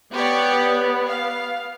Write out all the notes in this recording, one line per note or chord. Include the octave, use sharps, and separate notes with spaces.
B3 G4 C#5 D5
F5